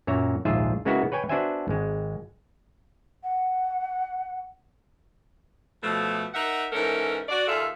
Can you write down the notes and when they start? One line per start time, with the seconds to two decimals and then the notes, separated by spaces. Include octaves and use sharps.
0.07 F#2 A#2 C#5 E5 A#5
0.45 A#1 D#2 G#2 F4 G#4 E5
0.85 C#3 G#3 A#3 B3 E4 F#4
1.12 B4 C#5 G5 G#5
1.29 B3 D4 F#4 C5 E5 G#5
1.68 G#1 G#3
3.23 F#5
5.83 B2 F3 A3
6.34 D#4 A#4 E5 F#5
6.72 G#2 E3 C#4 A4 A#4
7.29 F#4 D5
7.48 D#2 A#3 F4 G#4 A4 E5